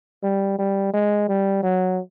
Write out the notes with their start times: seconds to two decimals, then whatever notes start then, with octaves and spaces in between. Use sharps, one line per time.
0.23 G3
0.59 G3
0.93 G#3
1.28 G3
1.63 F#3